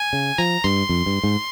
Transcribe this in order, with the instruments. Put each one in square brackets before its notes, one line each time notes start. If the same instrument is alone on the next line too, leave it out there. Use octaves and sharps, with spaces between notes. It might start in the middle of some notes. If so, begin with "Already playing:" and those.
Already playing: [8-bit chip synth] G#5
[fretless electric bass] C#3
[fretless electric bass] F3 [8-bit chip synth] A#5
[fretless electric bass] G2 [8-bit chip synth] C6
[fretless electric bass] F2
G2
G#2